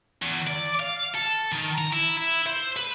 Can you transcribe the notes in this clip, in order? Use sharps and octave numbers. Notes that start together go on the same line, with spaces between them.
E2
D5
F5
A4
D#3
A#5
E4
E4
C5
B4